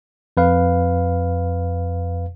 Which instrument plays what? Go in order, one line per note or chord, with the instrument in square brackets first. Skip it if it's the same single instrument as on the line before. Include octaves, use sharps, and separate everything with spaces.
[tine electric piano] F2 B4 F5